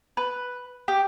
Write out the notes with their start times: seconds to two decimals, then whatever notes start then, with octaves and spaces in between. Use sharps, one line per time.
0.17 B4
0.88 G4